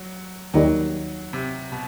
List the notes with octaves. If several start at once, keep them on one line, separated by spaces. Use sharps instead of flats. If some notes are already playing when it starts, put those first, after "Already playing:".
Already playing: F#3
D#2 D#3 F#3 G3
C3
B2